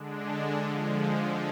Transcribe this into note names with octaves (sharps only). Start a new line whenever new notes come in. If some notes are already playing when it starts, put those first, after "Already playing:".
Already playing: D3 G#3 D4
D3 F3 G#3